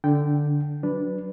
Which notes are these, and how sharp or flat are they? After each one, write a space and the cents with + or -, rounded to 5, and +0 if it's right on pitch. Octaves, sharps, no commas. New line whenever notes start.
D3 +0 D4 -25 G5 -10
F#3 +0 D4 -10 B4 +0